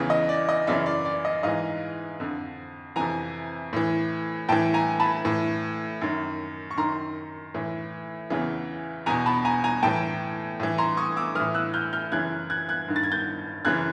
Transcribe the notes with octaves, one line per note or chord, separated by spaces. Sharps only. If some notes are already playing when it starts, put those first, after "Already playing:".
Already playing: E2 C#3 E3
D#5
D5
D#5
F#2 C#3 E3 D5 E5
D5
D5
D#5
G#2 E3 D#5 F5
F2 D3
F2 C3 E3 G#5 A#5
A2 E3
A2 E3 G5 A5
G#5 A#5
A5 B5
A2 E3
F#2 D#3
C#6
F#2 D#3 A#5 C6
A2 E3
E2 C#3 E3
E2 B2 G#5 A#5
A5 B5
G#5 A#5
G#5 A#5
A2 E3 G5 A5
A2 E3
A#5 C6
C#6 D#6
D6 E6
A2 E3 D#6 F6
E6 F#6
F6 G6
F6 G6
F#2 C#3 E3 F#6 G#6
F#6 G#6
F#6 G#6
G2 D#3
A6
G#6
G6 A6
F#2 C#3 E3 F#6 G#6